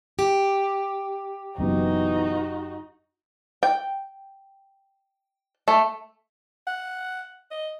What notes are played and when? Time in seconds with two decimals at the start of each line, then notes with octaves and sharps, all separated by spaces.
0.19 G4
1.58 F#1 F#2 B2 E3 A#3 D#4 F#4
3.63 G5
5.68 A3
6.67 F#5
7.51 D#5